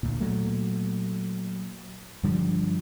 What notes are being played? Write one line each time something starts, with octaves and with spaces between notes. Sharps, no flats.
D2 A#2
A#2 F#3 A3
G2 D3 F3 G3